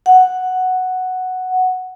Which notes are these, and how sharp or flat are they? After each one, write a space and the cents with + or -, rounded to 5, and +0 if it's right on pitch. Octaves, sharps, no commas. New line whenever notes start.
F#5 +0